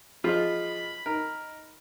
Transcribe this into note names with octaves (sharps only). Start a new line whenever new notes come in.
F3 F4 G#4 D#5 B5
D#4 A#4